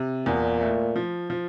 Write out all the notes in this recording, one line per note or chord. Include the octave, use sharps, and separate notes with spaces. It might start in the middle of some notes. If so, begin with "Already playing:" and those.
Already playing: C3
E2 A#2
A3
F3
F3